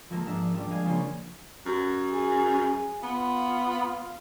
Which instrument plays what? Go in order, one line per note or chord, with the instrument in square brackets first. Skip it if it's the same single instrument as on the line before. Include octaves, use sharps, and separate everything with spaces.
[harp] F3 G#3 A#3 A4 A#4
G#2 D4 A#4 E5
F3 G3 D4
G#3 F5 G#5
C#3 F3 A#3 F4 C#5
[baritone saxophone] F#2
[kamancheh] G#4
[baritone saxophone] B3 [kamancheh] F4